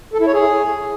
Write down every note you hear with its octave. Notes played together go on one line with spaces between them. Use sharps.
A4
E4
C#5
G#4